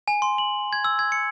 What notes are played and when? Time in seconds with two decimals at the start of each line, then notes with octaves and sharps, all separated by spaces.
0.08 G#5
0.22 C6
0.38 F#7
0.73 G#6
0.84 E6
0.99 G#6
1.12 C#7